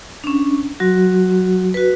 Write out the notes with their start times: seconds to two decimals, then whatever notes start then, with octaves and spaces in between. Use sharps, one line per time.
0.24 C#4 D4
0.80 F#3 F#4
1.74 F#4 B4